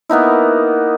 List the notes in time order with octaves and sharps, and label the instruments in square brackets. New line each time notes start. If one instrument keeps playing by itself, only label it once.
[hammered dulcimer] A#3 B3 D#4 E4